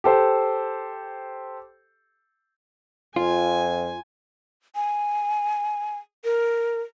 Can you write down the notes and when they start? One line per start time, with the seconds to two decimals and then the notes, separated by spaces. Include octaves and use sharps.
0.04 G4 A4 C5
3.16 F2 F4 G#5
4.75 G#5
6.24 A#4